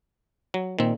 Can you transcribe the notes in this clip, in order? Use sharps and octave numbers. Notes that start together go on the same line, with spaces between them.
F#3
A#2 D#3 C4